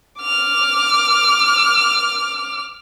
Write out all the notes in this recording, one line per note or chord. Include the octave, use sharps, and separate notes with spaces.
D6 F6